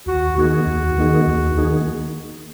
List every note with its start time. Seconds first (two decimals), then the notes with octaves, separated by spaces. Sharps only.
0.06 D#2 F#4
0.36 D#3 A#3 D#4 F#4 G#4
0.67 D#2
0.97 D#3 A#3 D#4 G#4
1.28 D#2
1.57 D#3 A#3 D#4 G#4